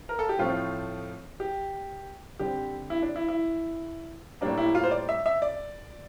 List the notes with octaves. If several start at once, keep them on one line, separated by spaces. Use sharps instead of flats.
A#4
A4
G4
A2 F3 A3 C4 F4
G4
D3 G3 C4 G4
E4
D4
E4
E4
A2 G3 A#3 D4
E4
F4
C5
D5
E5
E5
D5